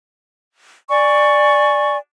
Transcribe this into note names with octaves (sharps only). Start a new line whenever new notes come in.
D5 G#5 C#6